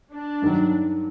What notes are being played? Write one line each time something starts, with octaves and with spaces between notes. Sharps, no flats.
D4
G2 D#3 F#3